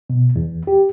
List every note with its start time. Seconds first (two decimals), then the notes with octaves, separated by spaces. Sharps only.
0.10 B2
0.36 E2
0.67 G4